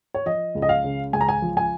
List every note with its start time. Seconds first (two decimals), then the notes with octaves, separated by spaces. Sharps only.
0.14 C#5
0.26 F3 D#5
0.55 C#2
0.62 D#5
0.69 F5
0.84 C#3
1.13 C#2 G#5
1.21 A#5
1.29 G#5
1.42 F3
1.57 G#5